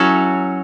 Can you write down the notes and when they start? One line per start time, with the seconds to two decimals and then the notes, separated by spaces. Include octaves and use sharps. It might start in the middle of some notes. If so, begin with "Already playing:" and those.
Already playing: F#3 C#4 E4 F#4 A4